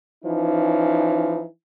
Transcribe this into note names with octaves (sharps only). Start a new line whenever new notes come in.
E3 F3 C#4 D#4